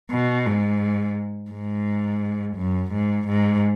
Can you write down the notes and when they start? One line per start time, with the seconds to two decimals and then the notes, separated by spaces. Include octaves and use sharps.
0.11 B2
0.46 G#2
1.51 G#2
2.56 F#2
2.92 G#2
3.27 G#2